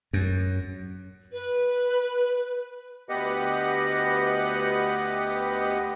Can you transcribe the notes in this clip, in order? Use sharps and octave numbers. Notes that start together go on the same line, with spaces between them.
F#2
B4
D2 B3 G4 B4 D#5 F#5